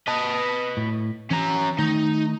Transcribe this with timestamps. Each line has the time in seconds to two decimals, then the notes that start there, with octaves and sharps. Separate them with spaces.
0.08 B4 D#5 A5
0.77 A2
1.31 E3 C#4 A#5
1.79 D#3 A3 D#4